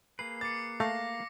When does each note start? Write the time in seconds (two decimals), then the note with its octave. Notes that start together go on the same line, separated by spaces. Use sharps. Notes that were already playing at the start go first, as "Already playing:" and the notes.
0.19 A#3 G#4 B4 C7
0.41 D6 A6 C#7
0.80 A3 F5 A#6